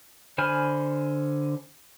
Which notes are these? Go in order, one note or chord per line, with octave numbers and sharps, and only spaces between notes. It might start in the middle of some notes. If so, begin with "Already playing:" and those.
D3 C5 G#5 B5 F6